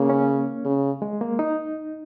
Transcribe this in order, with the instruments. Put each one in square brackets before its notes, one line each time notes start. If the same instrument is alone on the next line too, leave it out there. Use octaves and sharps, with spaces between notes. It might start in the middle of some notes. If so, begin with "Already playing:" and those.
Already playing: [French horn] C#3 [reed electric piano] A#3
[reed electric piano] C#4
[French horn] C#3
[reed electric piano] G#3
A#3
D#4